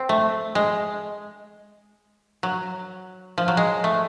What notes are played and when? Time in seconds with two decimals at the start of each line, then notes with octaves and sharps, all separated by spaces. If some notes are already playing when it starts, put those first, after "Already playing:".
Already playing: C4
0.09 A3
0.55 G#3
2.43 F#3
3.38 F3
3.48 F#3
3.57 G#3
3.84 A3